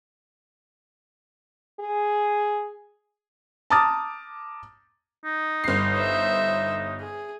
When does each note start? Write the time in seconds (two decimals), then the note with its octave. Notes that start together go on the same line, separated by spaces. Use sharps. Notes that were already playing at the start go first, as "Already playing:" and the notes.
1.80 G#4
3.70 A5 A#5 D6 D#6 F6 A6
5.25 D#4
5.64 G1 C7
5.97 C5 E5
7.01 G#4